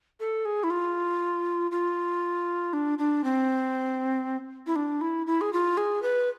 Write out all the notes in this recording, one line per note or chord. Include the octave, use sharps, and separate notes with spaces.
A4
G#4
E4
F4
F4
D4
D4
C4
E4
D4
E4
E4
G#4
F4
G#4
B4